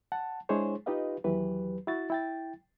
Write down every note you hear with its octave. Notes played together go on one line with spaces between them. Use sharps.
F#5 A5
G#3 D4 E4 G#4 C5 C#5
D#4 F4 G4 B4 D#5 F5
D#2 E3 F#3 G4 B4
E4 F#4 A6
E4 G5 A6